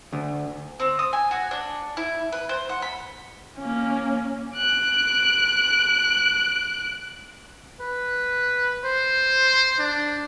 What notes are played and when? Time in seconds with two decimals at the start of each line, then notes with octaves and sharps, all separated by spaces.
0.12 D2
0.80 C4
0.99 D#6
1.13 G#5
1.31 F#4
1.51 D4
1.97 E4
2.32 B4
2.49 C5
2.69 F#5
2.82 B5
3.60 A#3 C#4
4.56 F#6 D7
7.80 B4
8.84 C5
9.79 D4